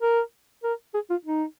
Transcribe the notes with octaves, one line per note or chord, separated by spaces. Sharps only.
A#4
A#4
G#4
F4
D#4